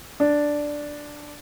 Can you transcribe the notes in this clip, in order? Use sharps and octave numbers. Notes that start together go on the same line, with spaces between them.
D4